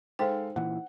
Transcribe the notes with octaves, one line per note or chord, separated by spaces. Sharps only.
G#3 D#4 A4 C5 F5 G5
A#2 E3 F#5